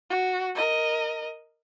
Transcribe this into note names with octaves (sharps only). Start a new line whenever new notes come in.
F#4
A#4 D#5